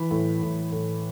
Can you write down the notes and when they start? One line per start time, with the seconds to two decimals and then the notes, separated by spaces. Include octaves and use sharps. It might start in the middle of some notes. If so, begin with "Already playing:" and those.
Already playing: E3 B5
0.11 A2
0.42 A2
0.72 A2